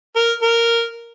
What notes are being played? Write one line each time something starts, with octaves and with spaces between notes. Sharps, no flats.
A#4
A#4